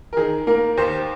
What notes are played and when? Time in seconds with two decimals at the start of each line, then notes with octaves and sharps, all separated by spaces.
0.13 A#4
0.17 D#3 G#4
0.47 A#3 A#4
0.77 D#2 C5